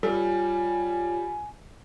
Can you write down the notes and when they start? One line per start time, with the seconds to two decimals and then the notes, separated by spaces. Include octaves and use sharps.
0.03 G3 F4 A4 C#5 G#5